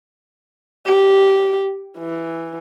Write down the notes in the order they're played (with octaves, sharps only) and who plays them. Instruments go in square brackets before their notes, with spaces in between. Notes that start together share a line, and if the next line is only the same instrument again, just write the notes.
[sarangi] G4
E3